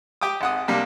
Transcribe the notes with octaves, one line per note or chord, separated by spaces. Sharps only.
G4 G5 D6 D#6
G#1 F#5 D#6
C3 G3 A#3 D4